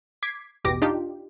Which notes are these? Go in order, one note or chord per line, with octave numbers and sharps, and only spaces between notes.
D6 G#6 B6 C7
A1 E2 B2 G4 D6 A#6
D4 D#4 F4 G4